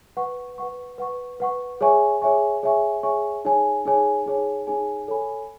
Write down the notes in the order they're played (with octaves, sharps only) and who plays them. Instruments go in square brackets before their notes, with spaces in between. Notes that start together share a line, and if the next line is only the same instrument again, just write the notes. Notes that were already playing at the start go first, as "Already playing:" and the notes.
[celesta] B4 F#5 C#6
B4 F#5 C#6
B4 F#5 C#6
B4 F#5 C#6
G#4 C#5 E5 G#5 C#6
G#4 C#5 E5 G#5 C#6
G#4 C#5 E5 G#5 C#6
G#4 C#5 E5 G#5 C#6
D#4 G#4 C#5 G#5
D#4 G#4 C#5 G#5
D#4 G#4 C#5 G#5
D#4 G#4 C#5 G#5
A4 C#5 G#5 B5